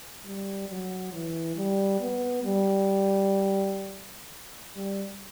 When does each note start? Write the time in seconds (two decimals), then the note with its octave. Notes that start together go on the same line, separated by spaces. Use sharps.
0.25 G3
0.69 F#3
1.13 E3
1.56 G3
2.00 B3
2.44 G3
4.76 G3